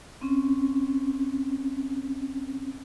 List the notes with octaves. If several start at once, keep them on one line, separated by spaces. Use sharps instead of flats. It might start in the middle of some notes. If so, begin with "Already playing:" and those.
C4 C#4